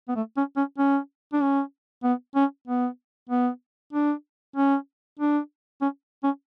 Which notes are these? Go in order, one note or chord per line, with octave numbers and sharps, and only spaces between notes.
B3
A3
C#4
C#4
C#4
D4
C#4
B3
C#4
B3
B3
D4
C#4
D4
C#4
C#4